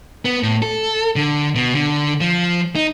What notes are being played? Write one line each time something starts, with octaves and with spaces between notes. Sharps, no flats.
B3
A2
A4
D3
B2
D3
F3
D#4